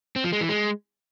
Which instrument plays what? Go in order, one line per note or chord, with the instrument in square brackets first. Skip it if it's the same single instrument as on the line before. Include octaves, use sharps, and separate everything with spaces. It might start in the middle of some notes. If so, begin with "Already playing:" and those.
[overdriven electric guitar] C4
F3
G#3
E3
G#3